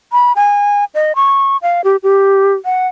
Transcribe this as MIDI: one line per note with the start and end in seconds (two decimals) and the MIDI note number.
0.12 0.33 83
0.36 0.85 80
0.95 1.13 75
1.16 1.57 85
1.62 1.81 77
1.84 1.97 67
2.03 2.53 67
2.65 2.88 78